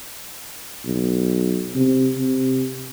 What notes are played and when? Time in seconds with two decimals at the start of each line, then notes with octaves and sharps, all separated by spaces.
0.85 B1
1.75 C3
2.17 C3